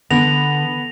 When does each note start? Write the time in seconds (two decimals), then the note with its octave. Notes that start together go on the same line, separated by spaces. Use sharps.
0.10 D3 B3 A#6 F7